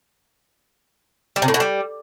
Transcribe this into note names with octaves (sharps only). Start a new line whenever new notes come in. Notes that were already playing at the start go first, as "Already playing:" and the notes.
G3
C3
A2
B2
G3